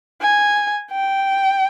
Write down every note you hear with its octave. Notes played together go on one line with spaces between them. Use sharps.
G#5
G5